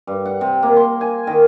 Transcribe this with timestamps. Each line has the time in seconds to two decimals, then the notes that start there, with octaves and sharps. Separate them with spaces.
0.07 G2
0.25 F#5
0.41 C3
0.63 A#3
0.77 C6
1.01 G#5
1.27 D#3